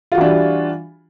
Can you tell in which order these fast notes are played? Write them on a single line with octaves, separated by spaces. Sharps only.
F4 F#4 E3 D4 G3